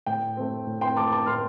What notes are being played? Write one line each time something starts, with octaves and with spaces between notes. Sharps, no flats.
A2 G5
A3 C4
A2
G5 C6
A3 C4 A5 D6
A5 D6
A2 C6 F6